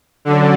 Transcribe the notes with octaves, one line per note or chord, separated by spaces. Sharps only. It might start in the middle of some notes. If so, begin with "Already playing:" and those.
D3 F#3 C#4 F#4 A4 D5